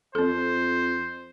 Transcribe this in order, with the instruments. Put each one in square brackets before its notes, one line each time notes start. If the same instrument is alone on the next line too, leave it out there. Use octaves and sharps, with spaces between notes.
[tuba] F2 [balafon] C4 A4 [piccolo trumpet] C5